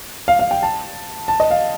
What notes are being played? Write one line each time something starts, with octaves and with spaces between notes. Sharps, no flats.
F5
F5
G5
A5
A5
D#5
F5